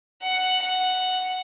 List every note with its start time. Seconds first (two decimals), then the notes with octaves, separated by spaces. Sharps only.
0.23 F#5
0.63 F#5